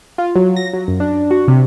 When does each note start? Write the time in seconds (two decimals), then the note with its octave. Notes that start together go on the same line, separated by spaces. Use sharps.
0.18 F4
0.36 F#3
0.56 A#6
0.73 F#3
0.88 F#2
1.00 D4
1.31 F#4
1.48 C3